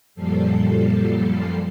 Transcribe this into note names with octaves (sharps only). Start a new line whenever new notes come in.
F#2 A#2 F3 G3 A4 C7